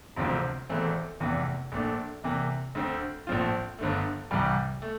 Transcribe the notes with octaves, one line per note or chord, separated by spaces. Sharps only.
E1 D2 C3 F3 C4
E1 E2 E3 A3 C4
F1 E2 C3 E3
A#1 A#2 A3 D4
E2 C3 E3 A#3
D2 D3 A3 C4
A#1 A2 F3 C4 F4
G1 G2 D3 A3
C2 C3 E3 G3
A3